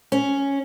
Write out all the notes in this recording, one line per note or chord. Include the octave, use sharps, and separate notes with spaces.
C#4